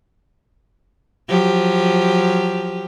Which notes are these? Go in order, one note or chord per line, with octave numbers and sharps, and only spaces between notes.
F3 F#3 G4